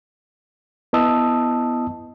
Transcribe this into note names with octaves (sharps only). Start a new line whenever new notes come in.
B3 E4 D#5 A5 D#6 E6